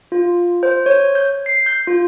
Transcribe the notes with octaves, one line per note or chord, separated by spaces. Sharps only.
F4
C5
C#5
G6
C7
G6
F4